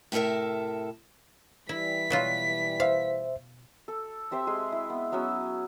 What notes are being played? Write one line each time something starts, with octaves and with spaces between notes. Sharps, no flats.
A2 C3 A4 A#4 E5
E3 G3 E4 B6
B2 F#3 F4
C5 E5 F5
A4
C4 G4 C5 E5
G#3 G#4 C6
E4
B3
F#3 B3 C#4 E6